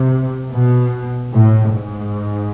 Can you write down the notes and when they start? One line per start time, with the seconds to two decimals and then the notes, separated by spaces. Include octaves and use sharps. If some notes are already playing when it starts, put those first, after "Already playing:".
Already playing: C3
0.51 B2
1.32 A2
1.72 G#2